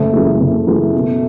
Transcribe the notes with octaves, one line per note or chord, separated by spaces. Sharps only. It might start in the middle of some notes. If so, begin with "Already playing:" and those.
Already playing: F#1 A3
F#2 E3 G#3
F#1 A3
F#2 E3 G#3
B2